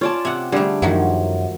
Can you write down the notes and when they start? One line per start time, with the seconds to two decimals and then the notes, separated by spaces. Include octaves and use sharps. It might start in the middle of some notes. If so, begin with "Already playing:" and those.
0.01 C#4 F4 D5 A5
0.25 C3 F#5
0.52 D3 G3 A3 G#4
0.82 F#2 D#3 F3 F#3